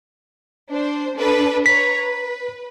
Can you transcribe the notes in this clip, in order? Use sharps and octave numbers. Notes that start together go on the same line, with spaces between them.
D4 C5
D4 A4 B4
B4 C#5 A#5 B6
B4